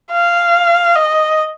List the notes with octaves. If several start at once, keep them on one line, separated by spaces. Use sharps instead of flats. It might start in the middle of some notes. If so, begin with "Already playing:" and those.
F5
D#5